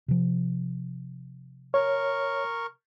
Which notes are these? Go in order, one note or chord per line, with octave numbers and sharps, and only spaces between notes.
C3 F3
A#4 C#5 C#6